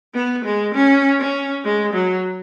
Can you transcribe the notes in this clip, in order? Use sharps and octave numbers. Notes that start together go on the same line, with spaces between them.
B3
G#3
C#4
C#4
G#3
F#3